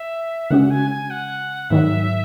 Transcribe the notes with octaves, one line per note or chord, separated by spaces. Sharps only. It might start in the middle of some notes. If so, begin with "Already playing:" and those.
Already playing: E5
C#3 G#3 C#4 F#4 F#5
G#5
G#5
F#5
G#2 D#3 F#3 E5